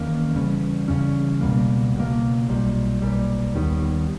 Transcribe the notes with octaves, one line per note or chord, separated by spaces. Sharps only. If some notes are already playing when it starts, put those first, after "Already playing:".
Already playing: E2 D#3 A#3 C#4
E2 C#3 G3 C#4
E2 C#3 G3 C#4
C#2 B2 G3 A#3
C#2 B2 G3 A#3
B1 A#2 G3
B1 A#2 G3
D#2 D#3 G3 B3